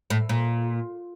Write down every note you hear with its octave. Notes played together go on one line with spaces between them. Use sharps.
A2
A#2